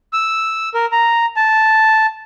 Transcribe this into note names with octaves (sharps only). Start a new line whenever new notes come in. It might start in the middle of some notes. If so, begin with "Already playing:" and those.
E6
A#4
A#5
A5